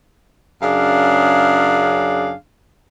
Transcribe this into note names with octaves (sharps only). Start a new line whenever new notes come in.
F#2 C#3 D4 G#4 F5